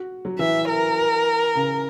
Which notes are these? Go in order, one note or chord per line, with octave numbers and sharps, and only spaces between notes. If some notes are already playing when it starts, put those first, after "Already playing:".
Already playing: F#4
F#3
E3 E5
A#4
C#3